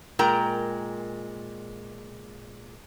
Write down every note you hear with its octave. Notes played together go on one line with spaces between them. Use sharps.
A#2 G#3 A#4 G5 A#5